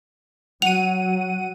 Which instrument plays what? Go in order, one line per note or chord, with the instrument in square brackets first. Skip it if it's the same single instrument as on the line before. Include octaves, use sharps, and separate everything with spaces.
[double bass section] F#3 [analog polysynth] F#5 D#7 [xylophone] F7